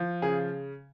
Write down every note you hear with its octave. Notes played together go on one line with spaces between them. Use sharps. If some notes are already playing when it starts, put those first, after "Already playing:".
Already playing: F3
C#3 G#4